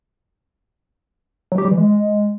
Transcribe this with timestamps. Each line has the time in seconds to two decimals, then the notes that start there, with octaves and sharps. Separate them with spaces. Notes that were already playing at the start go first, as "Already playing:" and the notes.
1.52 F#3
1.58 G4
1.65 G3
1.71 E3
1.78 G#3